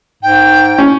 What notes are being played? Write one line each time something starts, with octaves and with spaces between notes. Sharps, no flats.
G#2 G5
C#4